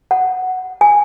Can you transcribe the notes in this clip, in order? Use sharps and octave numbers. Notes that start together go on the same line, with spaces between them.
F#5
G#5